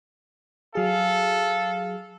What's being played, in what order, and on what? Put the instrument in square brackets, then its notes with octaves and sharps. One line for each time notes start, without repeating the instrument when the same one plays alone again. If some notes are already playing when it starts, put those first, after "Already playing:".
[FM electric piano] F#3 G#4 [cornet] A4 [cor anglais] F5